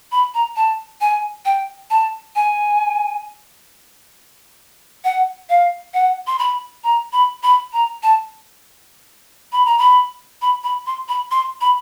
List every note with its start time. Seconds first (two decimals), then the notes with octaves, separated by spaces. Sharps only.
0.12 B5
0.34 A#5
0.56 A5
1.01 G#5
1.45 G5
1.90 A5
2.36 G#5
5.04 F#5
5.49 F5
5.94 F#5
6.27 C6
6.39 B5
6.84 A#5
7.13 B5
7.43 B5
7.73 A#5
8.03 A5
9.52 B5
9.66 A#5
9.78 B5
10.42 B5
10.64 B5
10.86 C6
11.09 B5
11.31 C6
11.61 B5